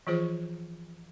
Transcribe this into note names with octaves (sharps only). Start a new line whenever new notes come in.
E3 F3 F4 G#4 C5 C#6